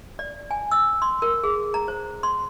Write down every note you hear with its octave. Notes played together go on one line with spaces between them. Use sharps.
D5
G#5
E6
C6
A#4
G#4
A#5
C5
C6